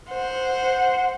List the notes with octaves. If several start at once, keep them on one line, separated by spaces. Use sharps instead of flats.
C5 F#5